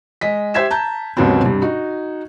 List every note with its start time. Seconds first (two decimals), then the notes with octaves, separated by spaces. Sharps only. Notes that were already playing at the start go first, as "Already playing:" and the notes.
0.21 G#3 D#5 B6
0.54 G4 C5 E5 G#6 B6 E7
0.71 A5 A#5 G6
1.17 D#2 G#2 C#3 F#3 B3 C4
1.42 G2 C3
1.62 D#4 F#4